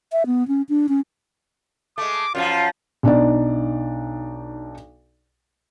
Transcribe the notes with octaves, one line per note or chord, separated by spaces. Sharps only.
E5
B3
C#4
D4
C#4
G#3 A3 D6
F#2 C#3 F3 F4
B1 D4 D#4 D5